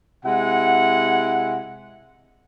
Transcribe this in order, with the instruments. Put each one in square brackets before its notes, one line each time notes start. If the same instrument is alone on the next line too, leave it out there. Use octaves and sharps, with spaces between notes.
[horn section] C3 G#3 E4 F#5